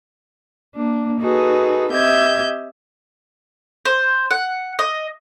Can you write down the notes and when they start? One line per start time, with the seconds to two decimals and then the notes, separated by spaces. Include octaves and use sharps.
0.75 A#3 D4
1.21 D#4 F#4 G#4 A4 B4
1.92 C4 G4 D#5 E5 G6 G#6
3.85 C5
4.31 F#5
4.79 D#5